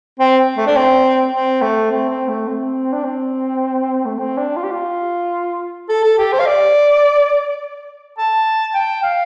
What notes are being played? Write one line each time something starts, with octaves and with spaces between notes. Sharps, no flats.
C4
A3
D4
C4
C4
A3
C4
C4
A3
C4
D4
C4
A3
C4
D4
F4
G4
F4
A4
A4
G4
C5
F5
D5
A5
G5
F5